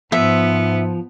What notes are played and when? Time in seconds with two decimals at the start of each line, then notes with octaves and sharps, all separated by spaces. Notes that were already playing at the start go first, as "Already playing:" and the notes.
0.12 G#2 F3 B3 E5